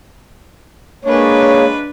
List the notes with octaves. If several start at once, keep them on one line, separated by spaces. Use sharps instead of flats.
G#3 A#3 D4 B4 C#5